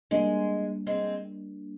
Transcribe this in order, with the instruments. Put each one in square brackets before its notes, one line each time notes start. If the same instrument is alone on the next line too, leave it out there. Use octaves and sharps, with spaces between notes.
[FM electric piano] G3 A#3 D4 [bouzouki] G#3
[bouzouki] G#3 C4